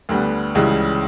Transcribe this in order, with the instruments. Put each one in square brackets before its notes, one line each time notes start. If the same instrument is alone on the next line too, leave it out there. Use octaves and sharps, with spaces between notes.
[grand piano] D2 D3 G3 B3
C#2 C#3 E3 G3